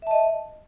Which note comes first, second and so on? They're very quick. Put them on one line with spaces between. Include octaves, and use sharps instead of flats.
E5 A5 D#5